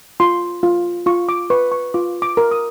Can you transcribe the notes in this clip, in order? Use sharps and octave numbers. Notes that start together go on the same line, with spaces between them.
F4 C6
F4
F4 C#6
D6
B4 C#6
C#6
F4 D6
D6
A#4
D#6